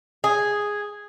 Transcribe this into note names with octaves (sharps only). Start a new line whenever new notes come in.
G#4